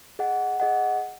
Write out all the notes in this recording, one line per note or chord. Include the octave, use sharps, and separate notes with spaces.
G#4 D#5 F#5
G#4 D#5 F#5